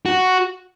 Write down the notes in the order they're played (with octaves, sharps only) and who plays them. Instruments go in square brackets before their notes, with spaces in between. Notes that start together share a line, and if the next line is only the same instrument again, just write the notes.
[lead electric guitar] F#4